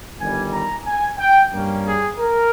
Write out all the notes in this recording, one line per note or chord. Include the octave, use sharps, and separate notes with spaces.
G1 G2 D#3 G3 G#5
A#5
G#5
G5
G2 G3 A#3 C#4
G#4
A#4